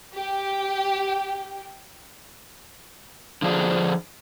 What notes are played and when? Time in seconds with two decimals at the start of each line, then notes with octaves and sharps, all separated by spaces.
0.13 G4 G5
3.42 D3 F3 D4 G#4 C5